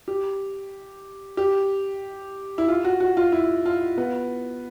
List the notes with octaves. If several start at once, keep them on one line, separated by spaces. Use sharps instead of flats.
G4
G4
E4
F4
F#4
F#4
F4
E4
F4
B3